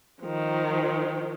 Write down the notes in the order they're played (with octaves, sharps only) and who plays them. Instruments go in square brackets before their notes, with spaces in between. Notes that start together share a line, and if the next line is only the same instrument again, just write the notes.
[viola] D#3 F3